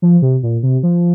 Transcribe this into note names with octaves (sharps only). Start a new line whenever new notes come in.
F3
C3
A#2
C3
F3